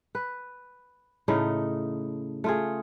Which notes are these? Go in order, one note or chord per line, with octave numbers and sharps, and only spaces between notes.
B4
A2 C#3 A3 D#4
A3 F4 G#4